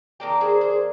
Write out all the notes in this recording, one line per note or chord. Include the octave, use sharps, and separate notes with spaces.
D#3 A#3 D4 G4 A#4
G#4 C5
G#4 C5